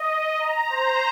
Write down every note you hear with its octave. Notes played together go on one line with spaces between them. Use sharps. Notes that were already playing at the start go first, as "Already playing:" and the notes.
Already playing: D#5
D#5
A#5
C5